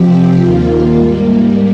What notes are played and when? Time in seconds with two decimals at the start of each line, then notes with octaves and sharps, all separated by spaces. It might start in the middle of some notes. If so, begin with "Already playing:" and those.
Already playing: C3 F3 C4 G4
0.38 D#2 D#3 A#3 F4
0.96 G#2 G3 A#3